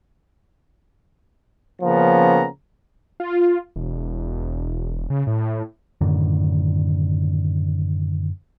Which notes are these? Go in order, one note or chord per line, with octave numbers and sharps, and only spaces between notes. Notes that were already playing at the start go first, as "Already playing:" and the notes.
C#3 F3 A#3 B3 C#4 A#5
F4
E1
C#3
A2
F#2 A2 D3 D#3